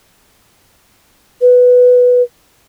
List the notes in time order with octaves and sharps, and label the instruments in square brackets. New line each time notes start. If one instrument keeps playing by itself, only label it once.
[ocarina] B4